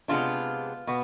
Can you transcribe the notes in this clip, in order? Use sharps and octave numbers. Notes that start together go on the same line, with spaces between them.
C3 F3 G#3 B3 D4 F4
B2 B3